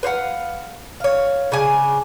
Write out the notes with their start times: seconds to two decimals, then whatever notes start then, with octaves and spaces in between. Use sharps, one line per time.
0.03 B4 C5 F5 F#5
1.00 C#5 F5
1.52 C#3 D4 G#5